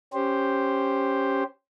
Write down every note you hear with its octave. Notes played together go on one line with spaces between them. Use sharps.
C#4 G4 C5